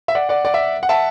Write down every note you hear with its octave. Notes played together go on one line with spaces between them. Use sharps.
E5
D5 F#5
D5 F#5
D5 F#5
E5
F#5
E5 A5